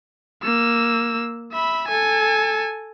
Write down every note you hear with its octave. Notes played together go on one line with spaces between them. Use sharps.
A#3 E6
E5 B5
A4 G#5